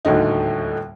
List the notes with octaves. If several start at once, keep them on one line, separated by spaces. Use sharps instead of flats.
D#1 D2 A2 D3 D#4